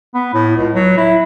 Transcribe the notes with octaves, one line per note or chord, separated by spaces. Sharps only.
B3
A2
C#2
F#3
E4